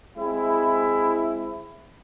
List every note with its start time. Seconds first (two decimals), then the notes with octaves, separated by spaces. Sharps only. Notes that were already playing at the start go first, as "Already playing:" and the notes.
0.15 G#3 C4 E4